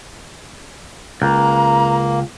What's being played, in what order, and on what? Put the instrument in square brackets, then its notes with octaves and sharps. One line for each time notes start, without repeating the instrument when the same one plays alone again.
[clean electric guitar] C#2 [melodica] A#3 [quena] A#5